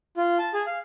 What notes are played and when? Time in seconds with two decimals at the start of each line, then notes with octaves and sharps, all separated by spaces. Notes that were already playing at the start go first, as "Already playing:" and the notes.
0.17 F4
0.39 A5
0.54 G#4
0.67 F5